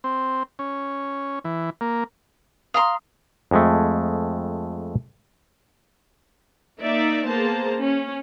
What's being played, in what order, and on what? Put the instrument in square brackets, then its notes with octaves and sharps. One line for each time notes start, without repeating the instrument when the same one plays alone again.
[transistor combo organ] C4
C#4
E3
A#3
[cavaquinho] F5 A#5 C6 [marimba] D#6
[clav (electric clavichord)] F2 G#3 A3
[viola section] A#3 D#4 D5 E5
A#3 B3 G#4 C5 A5 A#5
C#4